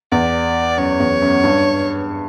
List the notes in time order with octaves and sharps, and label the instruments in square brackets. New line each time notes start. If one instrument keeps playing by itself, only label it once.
[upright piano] E2 [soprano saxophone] D5
[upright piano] F#2 [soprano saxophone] C#5
[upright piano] E2
F#2
G2